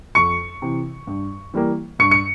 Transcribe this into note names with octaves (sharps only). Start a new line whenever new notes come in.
F2 C#6 C#7
C3 E3
G2
E3 G3 A#3
G2 C#6 C#7
C#7